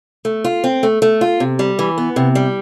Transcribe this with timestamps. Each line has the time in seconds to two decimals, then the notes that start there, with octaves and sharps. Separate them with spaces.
0.25 A3
0.44 F4
0.64 C4
0.83 A3
1.02 A3
1.21 F4
1.40 C3
1.59 G3
1.79 E3
1.98 B3
2.16 C3
2.35 G3